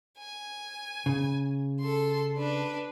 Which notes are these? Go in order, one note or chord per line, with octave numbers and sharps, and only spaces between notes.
G#5
C#3
A4 C6
D4 B4